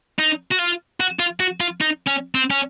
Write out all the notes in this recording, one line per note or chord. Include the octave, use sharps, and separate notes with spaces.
D#4
F#4
F4
F#4
F4
F#4
F4
D#4
C#4
C4
C#4